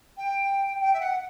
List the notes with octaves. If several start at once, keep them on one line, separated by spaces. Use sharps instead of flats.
G5
G5
E5
F#5